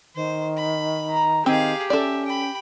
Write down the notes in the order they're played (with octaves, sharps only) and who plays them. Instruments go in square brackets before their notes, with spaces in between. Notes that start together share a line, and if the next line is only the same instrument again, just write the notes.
[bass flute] D#3 [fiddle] C5
[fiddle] B5
[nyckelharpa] A#5
[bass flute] D#3 [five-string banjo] C4 [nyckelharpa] G4 [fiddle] G#4 F5
[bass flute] C#4 [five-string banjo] A4 D5 [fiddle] E5
[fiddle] G5 B5